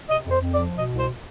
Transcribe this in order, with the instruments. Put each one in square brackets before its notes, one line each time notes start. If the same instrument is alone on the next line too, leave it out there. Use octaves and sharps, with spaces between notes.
[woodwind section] C3 D#5
F2
C5
F2
D5
F3
B2 D#5
C2 C5